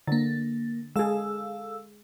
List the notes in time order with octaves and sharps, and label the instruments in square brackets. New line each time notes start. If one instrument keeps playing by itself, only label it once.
[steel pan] D3 [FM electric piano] A#3 A6
[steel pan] G#3 G#4 [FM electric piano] A4 F5 E6